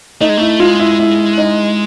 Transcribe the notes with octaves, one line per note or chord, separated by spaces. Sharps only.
A3 D#4
G#3
A3 E4
G#3 F4
E4
E4
D#4